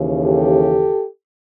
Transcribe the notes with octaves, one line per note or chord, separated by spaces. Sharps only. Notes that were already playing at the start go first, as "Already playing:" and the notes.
Already playing: D#2 C#3 E3
G4 A4